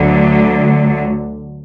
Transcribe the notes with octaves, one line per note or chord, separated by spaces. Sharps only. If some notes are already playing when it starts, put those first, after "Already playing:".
Already playing: D2 D3 F#3